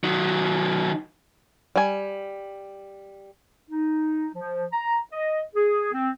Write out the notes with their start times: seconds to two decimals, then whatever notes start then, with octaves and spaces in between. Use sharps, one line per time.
0.04 D#3 F#3
1.76 G3 G#5
3.70 D#4
4.35 F3
4.72 A#5
5.13 D#5
5.55 G#4
5.93 C4